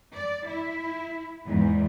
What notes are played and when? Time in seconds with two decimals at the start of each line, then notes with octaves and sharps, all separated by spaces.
0.15 D5
0.47 E4
1.45 E2 G#2